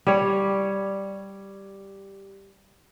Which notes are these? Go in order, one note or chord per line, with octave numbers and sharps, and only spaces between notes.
G3 C#5